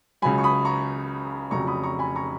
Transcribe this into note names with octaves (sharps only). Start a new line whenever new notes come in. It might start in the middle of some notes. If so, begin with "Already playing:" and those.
C#2 C#3 F#3 G#5 B5
C#6
B5 D#6
A#5 C#6
F1 F2 C#3 F#3 A#5 C#6
B5 D#6
A#5 C#6
G#5 B5
A#5 C#6